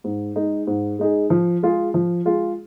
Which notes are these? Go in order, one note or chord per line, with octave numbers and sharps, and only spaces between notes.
G#2
G#3 D#4 G#4
G#2
G#3 D#4 G#4
F3
G#3 F4 G#4
F3
G#3 F4 G#4